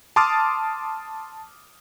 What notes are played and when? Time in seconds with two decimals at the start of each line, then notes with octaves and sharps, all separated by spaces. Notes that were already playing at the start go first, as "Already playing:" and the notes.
0.16 A5 C6 D6 D#6 F6 A6